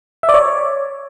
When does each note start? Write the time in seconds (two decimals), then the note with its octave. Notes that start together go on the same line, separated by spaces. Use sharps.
0.23 E5
0.29 D5
0.34 C#5